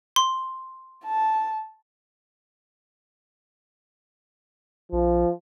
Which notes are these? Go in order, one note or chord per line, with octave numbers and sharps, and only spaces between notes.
C6
A5
A#1 F3